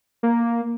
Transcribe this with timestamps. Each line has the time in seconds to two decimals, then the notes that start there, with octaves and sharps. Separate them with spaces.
0.23 A#3